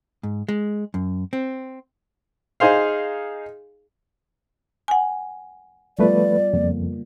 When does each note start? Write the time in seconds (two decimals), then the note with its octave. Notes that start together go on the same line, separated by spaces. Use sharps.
0.23 G#2
0.49 G#3
0.94 F#2
1.33 C4
2.60 D#4 G#4 C5 F5
4.88 F#5 G#5
5.99 F3 G3 A3 B3 F4 B4 D5
6.54 F2 C#3 A#3